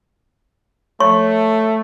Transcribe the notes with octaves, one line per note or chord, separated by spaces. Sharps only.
A3 C#5 C#6